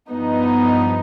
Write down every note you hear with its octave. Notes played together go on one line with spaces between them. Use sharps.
G2 F3 B3 D#4